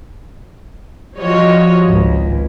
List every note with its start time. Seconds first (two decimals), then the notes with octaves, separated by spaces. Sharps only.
1.19 F3 G3 F4 F#4 C#5 D#5
1.84 G#1 C#2